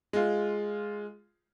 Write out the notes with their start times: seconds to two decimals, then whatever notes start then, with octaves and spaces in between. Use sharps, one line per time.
0.13 G#3 F4